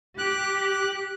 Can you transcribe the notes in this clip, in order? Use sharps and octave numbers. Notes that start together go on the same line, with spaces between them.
G4 F#6